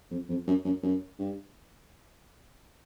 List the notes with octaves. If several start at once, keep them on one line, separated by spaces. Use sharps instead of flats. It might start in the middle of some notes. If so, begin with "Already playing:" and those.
F2
F2
F#2
F#2
F#2
G2